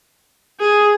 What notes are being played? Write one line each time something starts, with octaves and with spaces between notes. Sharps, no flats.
G#4